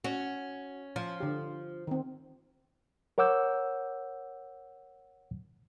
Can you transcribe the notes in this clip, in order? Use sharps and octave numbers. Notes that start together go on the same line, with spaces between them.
C#4 F#4
F3
D3 G4
D#3 C4
A#4 C#5 F#5 D6 E6 G6